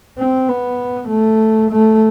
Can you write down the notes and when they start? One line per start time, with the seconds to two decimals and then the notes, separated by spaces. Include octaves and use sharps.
0.18 C4
0.48 B3
1.09 A3
1.71 A3